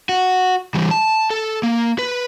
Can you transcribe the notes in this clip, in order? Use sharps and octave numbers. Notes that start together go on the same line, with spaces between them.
F#4
E3 G3
A5
A4
A#3
B4